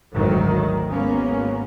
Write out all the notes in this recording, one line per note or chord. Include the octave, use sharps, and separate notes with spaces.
G#1 D2 D#3 F#3
G#1 A#3 B3 C#4